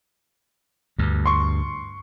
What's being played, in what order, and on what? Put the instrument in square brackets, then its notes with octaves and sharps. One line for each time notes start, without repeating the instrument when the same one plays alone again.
[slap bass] D2 G2
[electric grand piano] C6 C#6